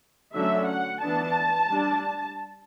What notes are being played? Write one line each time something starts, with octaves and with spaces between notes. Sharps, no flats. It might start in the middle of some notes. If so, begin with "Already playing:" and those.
D3 F#3 A3 C#4 E5
F#5
E3 B3 D4 A5
G3 D4